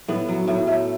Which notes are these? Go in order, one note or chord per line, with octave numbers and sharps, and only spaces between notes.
A2 B3
F#3
A2
A3